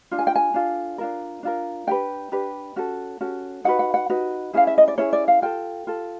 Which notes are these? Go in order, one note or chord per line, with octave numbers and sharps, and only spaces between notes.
D4 F4
G#5
G5
G#5
D4 F4 A4
D4 F4 A#4
D4 F4 A#4
D4 G4 B4 G5
D4 G4 B4
C#4 F#4 A4
C#4 F#4 A4
D#4 F#4 B4 F#5
F#5
F#5
D#4 F#4 B4
C#4 E4 G#4 F5
E5
D#5
D5
C#4 E4 G#4 C#5
D5
F5
F4 A4 G5
F4 A4